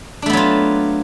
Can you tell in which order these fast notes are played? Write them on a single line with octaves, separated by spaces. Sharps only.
D4 A3 B3 F#3 F4